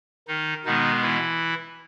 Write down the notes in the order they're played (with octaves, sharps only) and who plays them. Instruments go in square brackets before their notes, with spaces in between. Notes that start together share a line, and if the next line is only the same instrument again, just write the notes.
[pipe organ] D#3 D#4
B2 D#3 G#3 B3 D#4
E3 E4